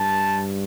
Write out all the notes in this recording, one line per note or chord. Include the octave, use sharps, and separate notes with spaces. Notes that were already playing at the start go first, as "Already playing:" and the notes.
Already playing: G2 A5